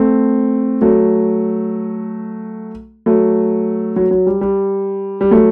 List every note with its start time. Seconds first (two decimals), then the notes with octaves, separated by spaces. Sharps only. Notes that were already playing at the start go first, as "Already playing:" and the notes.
Already playing: A3 C4
0.81 F#3 A3
3.06 F#3 A3
3.96 F#3
4.11 F#3
4.27 G3
4.41 G3
5.21 G3
5.31 F#3 A3